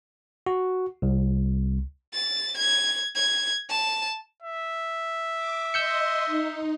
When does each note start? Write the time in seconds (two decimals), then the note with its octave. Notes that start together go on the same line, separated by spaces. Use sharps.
0.46 F#4
1.02 C2
2.14 A6
2.58 G#6
3.16 G#6
3.70 A5
4.43 E5
5.35 D6
5.74 D#5 C6 E6 G6 C#7
6.26 D#4